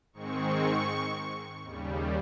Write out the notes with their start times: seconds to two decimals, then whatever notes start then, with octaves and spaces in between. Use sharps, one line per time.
0.13 G#2 D#3 G#3 C4 C#6
1.63 D#2 C#3 G3